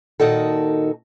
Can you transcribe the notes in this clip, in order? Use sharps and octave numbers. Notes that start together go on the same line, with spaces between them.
A#2 D#3 D#4 F#4 A4